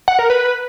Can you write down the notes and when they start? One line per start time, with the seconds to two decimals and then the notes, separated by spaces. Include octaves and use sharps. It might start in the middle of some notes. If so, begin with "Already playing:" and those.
0.08 F#5
0.19 A#4
0.30 B4